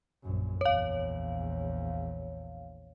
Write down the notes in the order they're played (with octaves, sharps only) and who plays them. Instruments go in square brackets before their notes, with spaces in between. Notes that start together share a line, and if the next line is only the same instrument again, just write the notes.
[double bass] A#1 F#2
[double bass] A#1 E2 [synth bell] C#5 F5